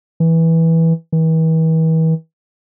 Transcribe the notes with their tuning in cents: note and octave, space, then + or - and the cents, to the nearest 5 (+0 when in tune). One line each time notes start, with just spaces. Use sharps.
E3 -10
E3 -40